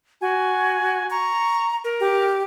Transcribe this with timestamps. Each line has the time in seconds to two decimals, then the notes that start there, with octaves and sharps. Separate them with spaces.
0.21 F#4 G#5
1.10 A#5 C#6
1.84 A#4
2.00 G4